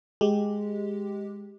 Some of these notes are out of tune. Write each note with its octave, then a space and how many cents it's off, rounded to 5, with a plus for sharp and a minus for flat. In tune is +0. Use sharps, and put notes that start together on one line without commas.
G#3 +0 G4 +0